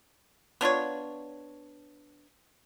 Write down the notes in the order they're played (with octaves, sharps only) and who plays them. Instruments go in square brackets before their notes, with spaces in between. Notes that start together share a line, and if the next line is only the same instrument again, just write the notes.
[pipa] B3 D4 F4 C#5